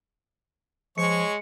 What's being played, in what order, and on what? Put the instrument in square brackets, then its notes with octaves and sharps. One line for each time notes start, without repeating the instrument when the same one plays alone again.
[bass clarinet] F3 [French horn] G#3 [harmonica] C#5 C#6 [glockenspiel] C#7